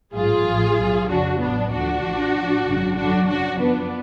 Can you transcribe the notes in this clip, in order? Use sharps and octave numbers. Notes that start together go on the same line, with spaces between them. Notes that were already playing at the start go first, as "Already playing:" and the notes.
A1 G#2 F#3 F4 G#4
A1 A2 F3
B1 B2 F#3
F2 C#3 F3 D4 F#4
A1 A2 F#3 B3 D4
D2 D3 F3 D4 F#4
A1 A2 F3
A1 A2 F3
G#1 F#2 C#3 F#3
F#2 D3 F#3 D4 F#4
F#2 C#3 F#3 D4 F#4
F#2 F3 B3 D4